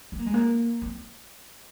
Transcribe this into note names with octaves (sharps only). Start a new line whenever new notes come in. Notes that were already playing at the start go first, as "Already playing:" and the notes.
C4
A#3
G#3
A#3
C4